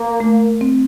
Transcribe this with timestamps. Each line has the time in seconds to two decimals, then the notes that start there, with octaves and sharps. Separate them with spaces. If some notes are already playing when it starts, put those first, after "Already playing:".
Already playing: A#3
0.20 A3
0.61 C4